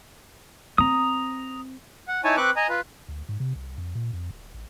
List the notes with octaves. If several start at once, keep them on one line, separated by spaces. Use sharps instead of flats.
C4 A#5 D#6
F#5
D#4 E4 C#5 G#5 A5
C4 B4 C#6 D6 F#6
D#5 G#5 A#5
F4 B4
D2
G#2
C3
C2
F2
A#2
F2
D1
A1